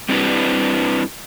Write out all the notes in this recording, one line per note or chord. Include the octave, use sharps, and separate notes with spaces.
G3 C4 D4 E4 G4 B4